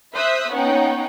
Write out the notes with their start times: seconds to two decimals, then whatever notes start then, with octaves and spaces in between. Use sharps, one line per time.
0.14 C5 E5 D#6 E6 F#6 B6
0.51 B3 C#4 D#4 C#5 F#5 G5